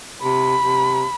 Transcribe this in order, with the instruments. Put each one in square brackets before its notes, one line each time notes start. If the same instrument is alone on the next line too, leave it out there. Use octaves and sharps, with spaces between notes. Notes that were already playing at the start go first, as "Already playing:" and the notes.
[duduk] C3 [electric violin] B5
[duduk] C3